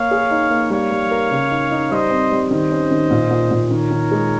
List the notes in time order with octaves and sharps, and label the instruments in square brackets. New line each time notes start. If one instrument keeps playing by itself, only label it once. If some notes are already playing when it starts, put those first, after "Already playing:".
Already playing: [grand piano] A#3 [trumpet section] C#5 F5
[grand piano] G#4
D#4
A#3
[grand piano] G3 [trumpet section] C#5 F5
[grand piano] G3
A#4
C#3
D#4
D#4
[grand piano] G3 [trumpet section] C5 D#5
[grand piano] C4
G3
[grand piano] D#3 [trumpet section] C5 D#5
[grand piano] C#4
D#3
A#2
A#2
A#2
[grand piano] D#3 [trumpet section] A#4 C#5
[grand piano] D#3
G#3